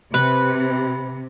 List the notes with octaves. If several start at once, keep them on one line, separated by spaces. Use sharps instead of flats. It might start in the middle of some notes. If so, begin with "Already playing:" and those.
C3 B4